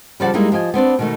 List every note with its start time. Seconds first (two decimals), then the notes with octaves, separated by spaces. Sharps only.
0.20 C#3 F3 G3 A4 D5 F#5
0.34 G3 G#3 A#3 D#4 E4 G#4
0.52 F3 G4 D#5 G#5
0.74 B3 C4 D4 D5
0.99 B2 D#3 A3